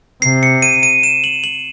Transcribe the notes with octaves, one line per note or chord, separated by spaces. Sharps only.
C3 C7
C#7
D#7
D#7
E7
F#7
F#7